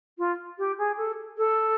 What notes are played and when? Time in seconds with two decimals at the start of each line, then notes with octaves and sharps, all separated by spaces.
0.18 F4
0.58 G4
0.78 G#4
0.97 A4
1.37 A4